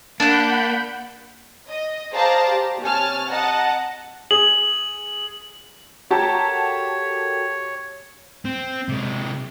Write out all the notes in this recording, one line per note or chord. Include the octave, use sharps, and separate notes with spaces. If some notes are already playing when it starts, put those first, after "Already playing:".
A#3 D4 F#5 B5 F#6 G6
D#5
G#4 C5 D5 F5 A5 A#5
G4
C3 C#5 G#5 A5 F6
D#5 F#5 A5 A#5
G#4 F#7
F#4 G4 A4 A#4 C#5 A5
C4
C3 G#3